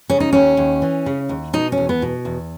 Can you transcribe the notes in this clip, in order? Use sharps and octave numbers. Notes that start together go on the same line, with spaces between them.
C#3 C#4
D#4
D#2 C#4
D#2
E3
C#3
D#2
B2 D#4
C#4
E2
B3
B2
E2